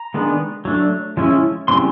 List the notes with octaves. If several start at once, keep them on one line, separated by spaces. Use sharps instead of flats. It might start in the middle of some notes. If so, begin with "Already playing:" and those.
Already playing: A#5
D#3 G#3 B3 D4
F#3 A3 D4
F3 G#3 C#4 E4
C#3 E3 G3 C4 C6